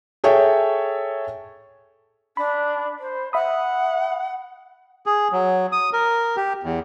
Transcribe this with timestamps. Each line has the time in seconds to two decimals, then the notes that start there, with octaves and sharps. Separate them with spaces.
0.24 G#4 A4 C#5 E5 G5
2.37 D4 B5
2.99 C5
3.33 E5 F#5 B5 D#6
5.06 G#4
5.32 F#3
5.72 D#6
5.93 A#4
6.37 G4
6.63 E2